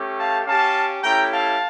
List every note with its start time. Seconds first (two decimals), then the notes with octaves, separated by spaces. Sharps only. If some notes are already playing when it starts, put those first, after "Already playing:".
Already playing: A3 C#4 G4
0.18 F5 A5
0.46 C#4 G4 F5 A5
1.03 A3 C#4 E4 G4 G5 A#5
1.32 F5 A5